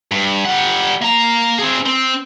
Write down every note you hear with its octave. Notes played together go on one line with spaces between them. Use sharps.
G2
G3 F#5
A#3 A#5
C4 G#4
C4